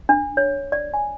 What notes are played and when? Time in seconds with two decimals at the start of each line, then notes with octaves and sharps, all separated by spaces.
0.09 D4
0.37 C#5
0.72 D5
0.94 G#5